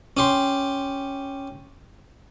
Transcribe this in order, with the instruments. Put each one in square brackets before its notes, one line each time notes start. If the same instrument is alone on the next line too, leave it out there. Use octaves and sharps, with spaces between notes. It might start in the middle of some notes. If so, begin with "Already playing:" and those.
[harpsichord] C#4 G4 C6